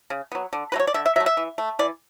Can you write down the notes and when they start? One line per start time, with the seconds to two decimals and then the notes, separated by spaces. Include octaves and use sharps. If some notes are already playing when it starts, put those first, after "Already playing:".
0.10 C#3
0.32 F#3 B3
0.53 D3
0.72 F#3 A3 B4
0.79 C#5
0.87 D5
0.94 D3 E5
1.06 E5
1.16 F#3 A3 E5
1.26 E5
1.37 E3
1.58 A3
1.79 E3 D5